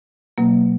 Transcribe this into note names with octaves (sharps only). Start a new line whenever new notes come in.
B2 F#3 A#3